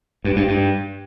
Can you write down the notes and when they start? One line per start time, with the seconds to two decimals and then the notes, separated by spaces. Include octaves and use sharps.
0.24 G2
0.36 G2
0.48 G2